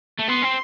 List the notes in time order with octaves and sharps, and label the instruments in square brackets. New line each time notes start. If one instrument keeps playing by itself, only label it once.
[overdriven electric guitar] A3
[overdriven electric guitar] B3 [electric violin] C6
[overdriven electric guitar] C4